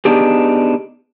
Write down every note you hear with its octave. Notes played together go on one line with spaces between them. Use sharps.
B3 D4 D#4 G4 G#4